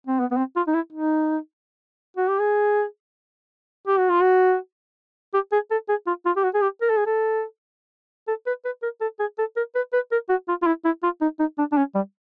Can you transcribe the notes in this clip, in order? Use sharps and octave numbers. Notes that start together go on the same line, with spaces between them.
C4
B3
B3
C4
F4
D#4
E4
D#4
F#4
G4
G#4
G4
F#4
F4
F#4
G4
G#4
A4
G#4
F4
F4
G4
F#4
G#4
G4
A#4
A4
G#4
A4
A4
B4
B4
A#4
A4
G#4
A4
A#4
B4
B4
A#4
F#4
F4
F4
E4
E4
F4
D#4
D#4
D4
D4
C#4
G3